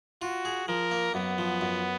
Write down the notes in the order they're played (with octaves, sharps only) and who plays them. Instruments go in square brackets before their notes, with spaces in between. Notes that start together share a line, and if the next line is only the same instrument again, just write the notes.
[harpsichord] F4 [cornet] F#4
[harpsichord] G#4
[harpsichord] F3 [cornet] A#4
[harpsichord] A#3
[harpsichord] F#2 [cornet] B3
[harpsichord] F3
F#2